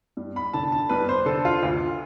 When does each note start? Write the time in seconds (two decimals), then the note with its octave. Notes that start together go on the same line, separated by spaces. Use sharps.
0.17 G2
0.36 B5
0.54 D3 A5
0.72 A5
0.89 G2 B4
1.09 C5
1.26 D3 A4
1.45 F4
1.63 D2